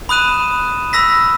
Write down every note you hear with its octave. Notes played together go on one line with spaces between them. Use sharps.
B5 D#6 F#6 D#7 E7
B5 E6 A#6 B6